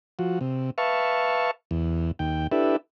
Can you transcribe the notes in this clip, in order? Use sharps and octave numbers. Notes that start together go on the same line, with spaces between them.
F3 F#4
C3
B4 E5 F5 A5 C#6
E2
D#2 G5
D4 E4 G4 A4 B4 E5